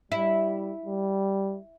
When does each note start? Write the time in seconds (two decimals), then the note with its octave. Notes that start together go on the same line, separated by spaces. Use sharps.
0.12 G3 E4
0.85 G3